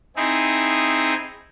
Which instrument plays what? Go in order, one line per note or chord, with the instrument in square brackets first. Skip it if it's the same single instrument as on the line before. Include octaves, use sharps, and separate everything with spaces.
[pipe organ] C4 D#4 E4 G#4